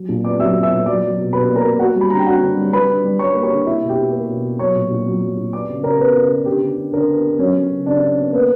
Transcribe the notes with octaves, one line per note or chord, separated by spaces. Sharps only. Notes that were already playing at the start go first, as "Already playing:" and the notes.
Already playing: F#3
A#2
B3 D5 D6
F#3 E5 E6
B3
E5 E6
A#2
F#3 D5 D6
F#3
B2
B2 B4 B5
A#3
A#4 A#5
A#3
A#3 F#4 F#5
G3
B5
D3 A#5
G5
D3 F#4 F#5
D3
G3
G3 B4 B5
D3
G3
G3 C#5 C#6
A#3
C#5 C#6
D3
A#3 E4 E5
B2
G4 G5
B2
A#3
B2
B2
F#3 C#5 C#6
A#2
A#2
F#3
F#3
A#2
B3 D5 D6
C#3
C#3 A#4 A#5
B3 B4
C#3
B3
D3 G4
D3
D3
D3 A#4
B3
B3
F#3 C#4 C#5
F#3
C#3
C#3 D4 D5
C#3
B3
A#3 B3 B4